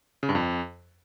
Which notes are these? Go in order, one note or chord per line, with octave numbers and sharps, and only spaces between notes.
C#3
G2
F2